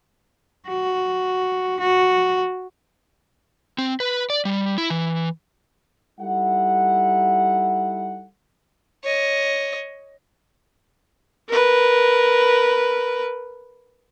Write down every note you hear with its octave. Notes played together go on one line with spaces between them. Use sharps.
F#4
F#4
C4
B4
D5
G3
E4
E3
G3 D#4 E4 A4 F#5
C#5 D#5
A#4 B4